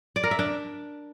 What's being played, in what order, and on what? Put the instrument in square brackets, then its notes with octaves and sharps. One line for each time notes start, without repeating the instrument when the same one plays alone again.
[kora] D5
A#4
E5
D4